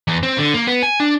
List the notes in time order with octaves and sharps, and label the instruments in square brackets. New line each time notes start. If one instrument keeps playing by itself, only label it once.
[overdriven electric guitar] E2
C4
D3
A#3
B3
G#5
D4